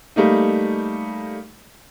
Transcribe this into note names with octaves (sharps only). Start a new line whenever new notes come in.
G3 A3 A#3 D#4